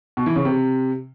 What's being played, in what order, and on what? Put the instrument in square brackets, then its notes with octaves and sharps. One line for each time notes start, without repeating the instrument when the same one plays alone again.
[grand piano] B2
E3
C#3
C3